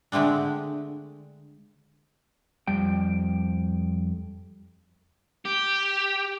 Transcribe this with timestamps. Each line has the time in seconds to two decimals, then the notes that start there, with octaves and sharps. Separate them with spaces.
0.12 D3 G#3 A3 C4 D4
2.68 F2 G3 G5
5.45 G4